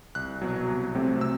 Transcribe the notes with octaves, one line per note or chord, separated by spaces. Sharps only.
C2 F#6
B2 F#3
C2
C3 F#3 A3 C4
C3 E6